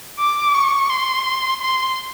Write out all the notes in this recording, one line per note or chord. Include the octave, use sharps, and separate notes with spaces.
D6
C#6
C6
C6